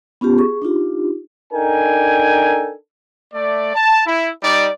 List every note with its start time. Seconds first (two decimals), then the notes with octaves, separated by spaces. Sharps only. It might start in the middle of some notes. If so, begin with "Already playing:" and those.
0.21 B3 C#4 F4 G4
0.38 G#4 C#6
0.62 D4 D#4 F4 G4
1.53 D4 D#4 A4 A#4 G5 G#5
3.34 A3 D5
3.75 A5
4.06 E4
4.43 G3 D#4 D5